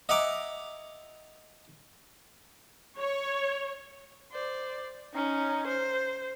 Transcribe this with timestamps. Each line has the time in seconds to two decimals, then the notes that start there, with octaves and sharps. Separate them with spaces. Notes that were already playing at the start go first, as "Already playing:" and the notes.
0.09 D#5 E5 F#5 G#5 A#5 D6
2.98 C#5
4.31 C5 D5
5.13 C#4 D#4
5.67 C5